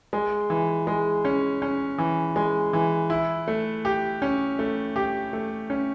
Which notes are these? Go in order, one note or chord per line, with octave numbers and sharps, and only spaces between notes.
G#3
E3
G#3
C#4
C#4
E3
G#3
E3
E4
A3
G4
C#4
A3
G4
A3
C#4